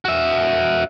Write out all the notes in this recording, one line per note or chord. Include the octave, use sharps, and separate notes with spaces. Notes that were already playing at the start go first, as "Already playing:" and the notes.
F#4 E5